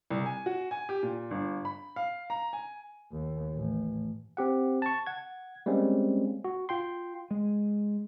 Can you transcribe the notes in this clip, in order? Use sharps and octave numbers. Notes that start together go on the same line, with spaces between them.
C2
G#5
F#4
G#5
G4
A#2
G1
B5
F5
A#5
G#5
D#2
A1
C4 G4 F#5
A5 C#6
F#5 G#6
G3 G#3 A#3 C4 C#4
F#4
F4 G5 C6
G#3